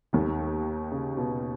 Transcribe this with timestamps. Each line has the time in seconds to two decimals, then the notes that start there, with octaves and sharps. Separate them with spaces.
0.13 D#2 D#3
0.92 C#3
1.17 B2